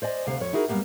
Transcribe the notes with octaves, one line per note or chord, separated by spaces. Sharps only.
C5 D5 D#5 G#5
D2 C3 F5
F2 C#5
D#4 E4 F#4 G#4 A#4
F#2 G3 A#3 B3